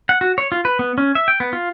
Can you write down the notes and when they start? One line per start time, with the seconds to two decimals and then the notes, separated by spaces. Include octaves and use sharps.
0.09 F#5
0.21 F#4
0.38 C#5
0.52 F4
0.65 B4
0.79 B3
0.98 C#4
1.15 E5
1.28 G5
1.40 B3
1.53 F4